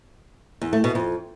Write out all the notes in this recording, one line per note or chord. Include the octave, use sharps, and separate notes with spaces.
E2
A3
B2
F2